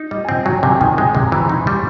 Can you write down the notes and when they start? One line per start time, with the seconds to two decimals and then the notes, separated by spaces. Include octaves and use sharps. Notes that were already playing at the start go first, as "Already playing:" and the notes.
Already playing: D#4
0.11 G3 D#5
0.25 G#5
0.28 C4 G5
0.45 F#3 G#5
0.63 C3 G#5
0.75 G5
0.81 D#3 G#5
0.98 G#3
1.15 C3
1.26 A#5
1.32 E3 B5
1.42 C6
1.49 D#4 C#6
1.67 G3